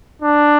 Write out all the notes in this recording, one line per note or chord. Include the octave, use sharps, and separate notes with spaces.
D4